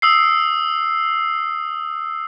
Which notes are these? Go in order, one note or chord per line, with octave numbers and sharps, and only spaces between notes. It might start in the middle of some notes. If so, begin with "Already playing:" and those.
D#6 E6 C7